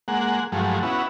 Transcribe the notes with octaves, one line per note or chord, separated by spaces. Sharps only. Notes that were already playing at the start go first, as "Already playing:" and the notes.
G#3 A#3 F#5
G2 F3 F#3 G#3 A3
B3 C#4 E4 F#4